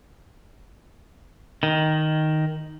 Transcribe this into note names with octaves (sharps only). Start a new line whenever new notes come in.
D#3